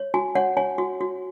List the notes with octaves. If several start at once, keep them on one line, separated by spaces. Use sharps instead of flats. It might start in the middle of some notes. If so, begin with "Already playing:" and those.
Already playing: C#5
F#4 G#5
C#5 F#5
C#5 G#5
F#4
F#4